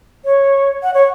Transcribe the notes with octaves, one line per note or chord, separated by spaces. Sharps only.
C#5
F#5
C#5